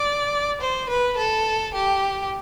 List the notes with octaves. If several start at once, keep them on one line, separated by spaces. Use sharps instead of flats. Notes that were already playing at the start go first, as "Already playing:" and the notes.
Already playing: D5
C5
B4
A4
G4